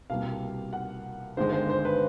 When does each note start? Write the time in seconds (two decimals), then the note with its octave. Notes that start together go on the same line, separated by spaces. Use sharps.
0.10 C2 B2 G3 A#3 F5
0.73 F#5
1.37 G1 G2 D#3 G#3 C5
1.52 C5
1.70 C5
1.85 B4